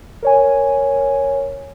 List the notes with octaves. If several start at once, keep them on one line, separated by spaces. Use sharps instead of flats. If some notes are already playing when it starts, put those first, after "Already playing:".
A#4 C#5 G#5